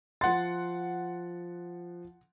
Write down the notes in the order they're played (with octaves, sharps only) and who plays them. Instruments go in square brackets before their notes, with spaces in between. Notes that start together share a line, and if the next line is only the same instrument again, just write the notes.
[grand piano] F3 A6 [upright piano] F#5 C6